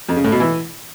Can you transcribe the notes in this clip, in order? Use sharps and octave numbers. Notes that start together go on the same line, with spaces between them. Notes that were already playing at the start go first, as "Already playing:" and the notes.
F2
C#3
A2
B2
E3